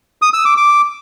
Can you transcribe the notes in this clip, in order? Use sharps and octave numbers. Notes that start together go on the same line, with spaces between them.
D#6
E6
D6
D6